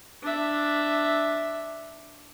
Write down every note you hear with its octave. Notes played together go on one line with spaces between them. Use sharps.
D4 E5